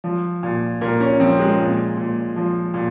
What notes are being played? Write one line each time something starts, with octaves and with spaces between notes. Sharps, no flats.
F3
A#2
A#2 A#4
C#4
F3 C4
G#3
A#2
A#2
F3
A#2